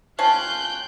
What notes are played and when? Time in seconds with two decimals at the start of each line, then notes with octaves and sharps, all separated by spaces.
0.19 C#4 F4 F5 G5 A5 F#6 G6